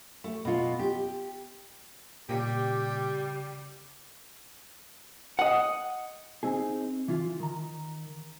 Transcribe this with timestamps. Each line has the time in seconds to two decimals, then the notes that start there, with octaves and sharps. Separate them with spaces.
0.24 A3
0.45 B2 F4
0.79 G4
2.29 A#2 C#3 G3 G4
5.39 D#5 F#5
6.43 C4 D#4 G#4
7.08 E3 F4
7.40 D#3 A#5